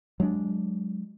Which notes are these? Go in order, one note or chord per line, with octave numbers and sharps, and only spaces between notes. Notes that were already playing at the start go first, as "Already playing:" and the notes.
F#3 G#3 B3 D4